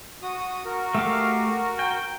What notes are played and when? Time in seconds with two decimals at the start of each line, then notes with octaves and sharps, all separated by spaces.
0.22 F#4 D#6
0.65 F#4 A#4
0.95 A3 G4 F5
1.79 G5